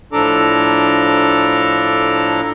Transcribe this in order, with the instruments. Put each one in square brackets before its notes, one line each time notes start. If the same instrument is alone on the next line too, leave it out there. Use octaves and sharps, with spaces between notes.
[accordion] A2 F3 D4 A4 A#5 D6